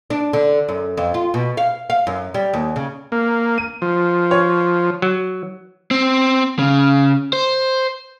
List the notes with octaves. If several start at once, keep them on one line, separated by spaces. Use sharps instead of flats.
D4
D3
F#2
F2
F4
B2
F5
F5
F#2
G3
D#2
C#3
A#3
D#7
F3
C#5
F#3
C4
C#3
C5